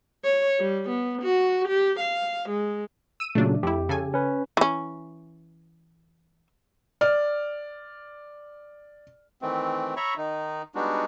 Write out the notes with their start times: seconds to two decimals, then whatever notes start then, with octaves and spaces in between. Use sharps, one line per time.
0.24 C#5
0.59 G3
0.89 B3
1.22 F#4
1.68 G4
2.00 F5
2.49 G#3
3.20 E6 D#7
3.35 A#2 C#3 F#3 A3 D4
3.63 F2 E4 G4
3.89 C#3 A4 G#5
4.14 C#4 B4
4.57 E3 C#4
7.01 D5 F6
9.42 D#3 E3 A3 C4
9.97 C#5 E5 A#5 B5 C#6
10.17 D#3 D#4
10.75 G3 G#3 B3 D4 D#4 F#4